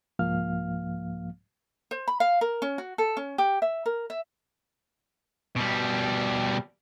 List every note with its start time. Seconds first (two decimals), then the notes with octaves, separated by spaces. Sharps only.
0.19 C2 G#2 F3 A#3 F5 F6
1.91 C5
2.08 B5
2.20 F5
2.41 A#4
2.62 C#4
2.78 F#4
2.98 A4
3.17 C#4
3.38 G4
3.62 E5
3.86 A#4
4.10 E5
5.56 B2 G3